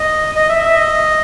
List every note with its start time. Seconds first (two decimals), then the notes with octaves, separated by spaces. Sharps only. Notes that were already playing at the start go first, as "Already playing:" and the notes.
Already playing: D#5
0.36 D#5
0.49 E5
0.63 E5
0.76 D#5